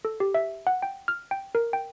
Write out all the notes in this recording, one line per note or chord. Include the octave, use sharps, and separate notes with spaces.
A4
G4
E5
F#5
G5
F6
G5
A#4
G5